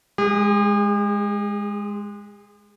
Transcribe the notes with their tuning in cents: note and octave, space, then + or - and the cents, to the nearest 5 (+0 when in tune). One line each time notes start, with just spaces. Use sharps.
G#3 -5 G#4 -45